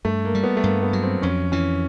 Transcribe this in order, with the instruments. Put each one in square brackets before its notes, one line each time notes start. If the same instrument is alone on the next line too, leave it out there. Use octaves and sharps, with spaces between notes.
[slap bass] G2 [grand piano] A3
[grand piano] A#3
[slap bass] G3
[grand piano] B3
A3
[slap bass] G2 [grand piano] A#3
[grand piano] B3
[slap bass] F#3
[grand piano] C4
[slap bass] F2 [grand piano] C#4
[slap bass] E3 [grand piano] C#4